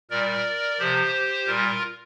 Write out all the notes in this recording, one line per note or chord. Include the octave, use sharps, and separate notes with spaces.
A#2 G3 A#4 D5
C3 F3 G4 C5
A#2 G3 F4 A#4